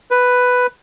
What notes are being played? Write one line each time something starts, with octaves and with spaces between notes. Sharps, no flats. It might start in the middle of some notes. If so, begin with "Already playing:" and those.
B4